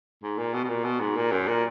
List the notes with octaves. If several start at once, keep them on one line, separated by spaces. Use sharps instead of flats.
G#2
A#2
B2
B2
A#2
B2
G#2
A#2
F#2
A#2